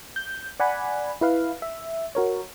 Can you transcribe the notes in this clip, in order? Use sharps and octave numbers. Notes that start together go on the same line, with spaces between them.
G6
D5 F#5 G#5 B5
E4 B4 F5
E5
F#4 A#4 C#5